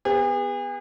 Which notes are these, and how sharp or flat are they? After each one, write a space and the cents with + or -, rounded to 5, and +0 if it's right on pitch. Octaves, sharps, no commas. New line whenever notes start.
B3 +0 G#4 -45